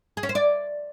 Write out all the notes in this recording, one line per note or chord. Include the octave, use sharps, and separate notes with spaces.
G#4
C#4
C5
D5